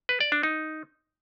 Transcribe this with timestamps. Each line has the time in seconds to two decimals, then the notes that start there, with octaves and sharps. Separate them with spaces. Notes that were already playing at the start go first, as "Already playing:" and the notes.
0.09 B4
0.21 D5
0.32 D4
0.43 D#4